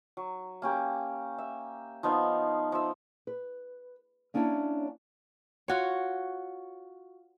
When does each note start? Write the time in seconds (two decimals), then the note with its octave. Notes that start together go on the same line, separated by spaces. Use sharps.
0.17 F#3
0.62 A#3 C#4 G4
1.38 E5
2.03 F3 B3 D#4 F5
2.72 F3 E5
3.27 B4
4.34 A#3 C#4 D4 E4 C#5 E5
5.68 F4 F#4 C#5